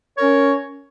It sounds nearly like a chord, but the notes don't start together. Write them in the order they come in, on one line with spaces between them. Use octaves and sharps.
C#5 A#4 C#4